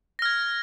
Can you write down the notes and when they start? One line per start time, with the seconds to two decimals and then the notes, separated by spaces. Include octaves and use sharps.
0.19 A#6
0.22 F6
0.25 G#6